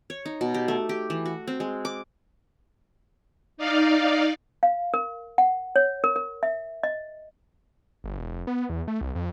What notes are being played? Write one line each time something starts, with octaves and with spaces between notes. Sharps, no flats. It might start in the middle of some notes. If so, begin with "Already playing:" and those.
C#5
D#4
B2
G4
A3
G4
E3
F#4
C4
G#3
D6
D#4 D5 F5
F5
A#4
F#5
C#5
A#4
A#4
E5
D#5
G1
E1
F1
B3
E2
A3
C2
F2